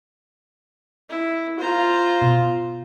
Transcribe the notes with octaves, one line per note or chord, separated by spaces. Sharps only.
E4
F4 C5 A#5
B2